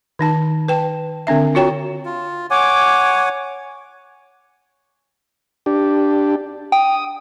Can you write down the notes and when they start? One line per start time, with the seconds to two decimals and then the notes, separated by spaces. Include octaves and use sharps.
0.19 D#3 D#4 A5
0.68 B4 G5 A5
1.27 D3 C4 D4 E5
1.55 F4 F#4 C#5 G5 A#5
2.05 F4
2.51 C#5 F#5 G#5 D6
5.66 D4 G4
6.72 G5 D#6